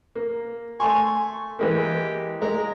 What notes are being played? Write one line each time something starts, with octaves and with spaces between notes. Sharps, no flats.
A#3
A3 G#5 C6 C#6
E3 G#3 A#3 G4
G#3 A#4